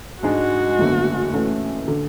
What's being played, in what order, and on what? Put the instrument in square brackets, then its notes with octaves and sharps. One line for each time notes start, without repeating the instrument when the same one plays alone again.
[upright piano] G#2 G#3 D4 [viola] F#4
[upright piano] F#1 E2 D3 F#3 A3
A2 E3 A3 C#4
D3